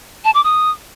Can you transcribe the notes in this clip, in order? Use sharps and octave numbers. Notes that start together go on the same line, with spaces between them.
A5
D6
D#6